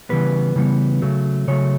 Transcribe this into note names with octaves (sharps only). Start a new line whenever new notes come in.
C#3 E3 G3 B3 B4
C#3 E3 G3 B3
C#3 F#3 A3
C#3 F#3 A3 C#5